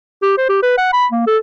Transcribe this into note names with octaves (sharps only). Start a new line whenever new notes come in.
G4
C5
G4
B4
F#5
B5
A#3
A4